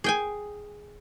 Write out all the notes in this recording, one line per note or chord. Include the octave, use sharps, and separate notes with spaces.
G#4 G5 G#5